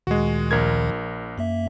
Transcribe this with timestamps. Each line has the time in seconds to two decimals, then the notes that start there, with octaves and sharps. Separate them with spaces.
0.07 D2 A#2 D#3 G#3 F#4
0.51 A#1 A#4 G#6
1.38 F#2 A#3 E5